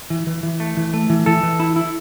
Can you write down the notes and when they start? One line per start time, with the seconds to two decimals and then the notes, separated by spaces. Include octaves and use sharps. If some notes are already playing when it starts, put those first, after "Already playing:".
0.10 E3
0.27 E3
0.43 E3
0.60 A3
0.77 E3
0.94 A3
1.10 E3
1.26 E3 A4
1.43 E3
1.60 E4
1.76 E4